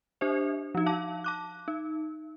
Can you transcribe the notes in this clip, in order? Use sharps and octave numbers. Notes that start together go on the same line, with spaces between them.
D4 G4 C5 E5
F3 D#4
F5 A5 D6
A5 D6 F#6
D#4